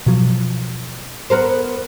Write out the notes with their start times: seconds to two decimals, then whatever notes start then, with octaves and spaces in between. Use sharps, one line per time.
0.06 B2 F3 F#3
1.30 B3 A#4 C5